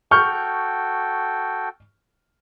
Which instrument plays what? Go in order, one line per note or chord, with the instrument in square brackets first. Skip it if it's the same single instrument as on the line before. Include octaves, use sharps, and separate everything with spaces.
[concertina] F#4 A4 G5 [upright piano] C#6 F6 G6